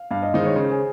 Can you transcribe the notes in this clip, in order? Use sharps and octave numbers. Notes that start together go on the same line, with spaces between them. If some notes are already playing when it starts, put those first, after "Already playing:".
Already playing: F5
G2 F5
D#5
D#3 G#3 D#4 C5
C#5
C#3 C5
G#4